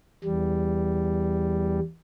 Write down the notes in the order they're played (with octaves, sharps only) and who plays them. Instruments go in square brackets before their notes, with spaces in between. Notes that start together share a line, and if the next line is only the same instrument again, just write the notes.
[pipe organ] E2 G3